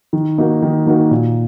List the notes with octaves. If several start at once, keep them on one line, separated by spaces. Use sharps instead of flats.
D#3
A#3 D#4 F#4 A#4
D#3
A#3 D#4 F#4 A#4
A#2